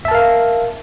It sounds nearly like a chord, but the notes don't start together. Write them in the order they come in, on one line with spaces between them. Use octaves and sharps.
E5 A5 A#4 F5